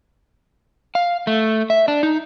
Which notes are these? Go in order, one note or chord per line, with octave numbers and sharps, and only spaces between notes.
F5
A3
E5
D4
D#4